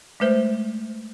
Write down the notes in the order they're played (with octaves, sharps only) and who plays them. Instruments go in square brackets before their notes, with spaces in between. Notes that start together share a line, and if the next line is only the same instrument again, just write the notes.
[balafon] G#3 A3 B4 C5 E5